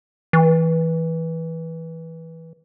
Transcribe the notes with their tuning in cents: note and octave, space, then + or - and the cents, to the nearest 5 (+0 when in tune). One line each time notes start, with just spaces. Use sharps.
E3 -15